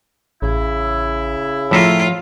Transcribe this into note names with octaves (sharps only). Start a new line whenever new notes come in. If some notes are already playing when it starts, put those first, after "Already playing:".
A1 C#3 E4
A2 F3 F4 E5 A#5